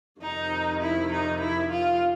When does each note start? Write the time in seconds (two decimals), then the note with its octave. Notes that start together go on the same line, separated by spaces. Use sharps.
0.21 F2 C3 D#3 D#4
0.82 E4
1.12 D#4
1.41 E4
1.72 F4